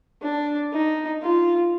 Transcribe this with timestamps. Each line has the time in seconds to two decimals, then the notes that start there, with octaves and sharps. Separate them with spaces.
0.22 D4
0.72 D#4
1.22 F4